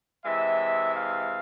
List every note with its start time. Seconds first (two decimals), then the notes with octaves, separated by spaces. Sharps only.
0.25 C3 E3 G#3 E5
0.96 F5